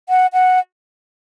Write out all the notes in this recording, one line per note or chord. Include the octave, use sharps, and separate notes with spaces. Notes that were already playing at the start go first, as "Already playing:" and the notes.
F#5
F#5